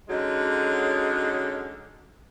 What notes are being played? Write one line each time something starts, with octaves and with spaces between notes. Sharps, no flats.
D3 F#3 G#3 C#4 D#4